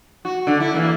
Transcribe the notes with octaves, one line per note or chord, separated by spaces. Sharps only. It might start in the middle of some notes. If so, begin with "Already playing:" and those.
F#4
D3
E4
E3 A#3